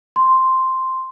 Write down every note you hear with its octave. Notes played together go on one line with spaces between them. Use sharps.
C6